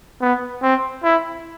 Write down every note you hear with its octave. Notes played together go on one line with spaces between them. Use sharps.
B3
C4
E4